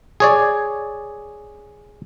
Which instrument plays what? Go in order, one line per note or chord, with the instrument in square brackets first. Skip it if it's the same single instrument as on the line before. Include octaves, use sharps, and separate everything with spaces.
[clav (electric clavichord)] G#4 C#5 D5